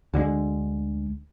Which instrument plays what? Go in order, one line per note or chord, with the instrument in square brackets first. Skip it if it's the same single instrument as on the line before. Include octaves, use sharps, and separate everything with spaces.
[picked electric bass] D2 D3 F#3 G#3